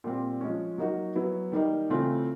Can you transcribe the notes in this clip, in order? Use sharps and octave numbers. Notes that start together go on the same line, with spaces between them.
A#2 G3 C4
F3 G#3 C#4
F#3 A#3 D#4 F#4
F#3 B3 E4
D#3 G3 A#3 D#4
C#3 E3 A3 C4 F4